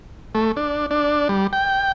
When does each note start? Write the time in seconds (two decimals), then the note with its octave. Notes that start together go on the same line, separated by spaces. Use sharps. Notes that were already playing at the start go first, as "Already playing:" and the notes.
0.35 A3
0.57 D4
0.91 D4
1.29 G3
1.53 G5